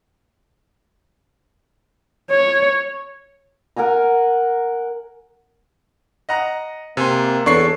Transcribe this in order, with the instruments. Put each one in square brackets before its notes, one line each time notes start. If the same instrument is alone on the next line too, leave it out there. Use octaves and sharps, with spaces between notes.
[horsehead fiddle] C#5
[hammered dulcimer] A#4 F#5 G#5 A#5
[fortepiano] D#5 F#5 A#5
[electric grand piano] C3 [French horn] A#3 [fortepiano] G#5 C6
[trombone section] E2 [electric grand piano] D4 C#6 C7 [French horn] A4 [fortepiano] C#5